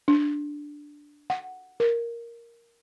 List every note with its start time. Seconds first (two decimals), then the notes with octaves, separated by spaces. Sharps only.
0.08 D4
1.30 F#5
1.80 A#4